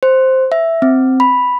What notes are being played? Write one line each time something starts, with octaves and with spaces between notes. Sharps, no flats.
C5
E5
C4
B5